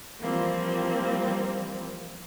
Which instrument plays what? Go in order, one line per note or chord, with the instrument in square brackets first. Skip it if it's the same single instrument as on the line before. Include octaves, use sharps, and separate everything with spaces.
[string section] E3 F3 G3 A#3 C4